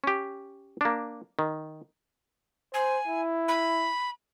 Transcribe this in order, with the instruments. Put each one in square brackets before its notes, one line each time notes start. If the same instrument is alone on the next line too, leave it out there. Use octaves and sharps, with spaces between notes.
[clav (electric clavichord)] C#4 G4
A#3 D4
D#3
[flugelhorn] C5 [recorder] G#5
[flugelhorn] E4
[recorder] B5